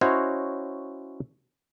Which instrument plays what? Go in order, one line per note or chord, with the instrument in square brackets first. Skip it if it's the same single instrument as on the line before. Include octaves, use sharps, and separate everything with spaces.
[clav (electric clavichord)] C#4 E4 F#4 C5 C#5 D#5